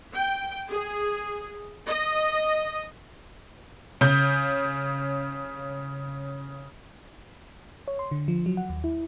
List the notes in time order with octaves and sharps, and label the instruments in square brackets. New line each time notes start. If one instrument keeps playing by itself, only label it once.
[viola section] G5
G#4
D#5
[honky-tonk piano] C#3 G6
[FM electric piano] C#5
C6
D3
F3
F#3
F#5
D#2
E4